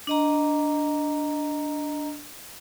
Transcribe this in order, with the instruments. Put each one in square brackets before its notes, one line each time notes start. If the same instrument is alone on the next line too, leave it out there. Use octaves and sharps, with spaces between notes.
[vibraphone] D4 D#5 A#5